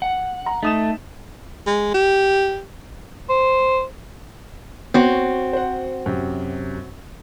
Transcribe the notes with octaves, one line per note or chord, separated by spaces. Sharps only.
F#5
A#5
A3 D#4 D#6 E7
G#3
G4
C5
B3 C4 F#4 C#5
C5 F#5
F#2 C3